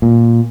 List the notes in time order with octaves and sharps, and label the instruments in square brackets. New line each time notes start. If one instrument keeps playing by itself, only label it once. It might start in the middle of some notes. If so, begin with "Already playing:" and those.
[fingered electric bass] A#2